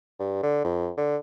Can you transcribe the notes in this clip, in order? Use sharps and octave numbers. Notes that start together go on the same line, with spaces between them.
G2
D3
F2
D3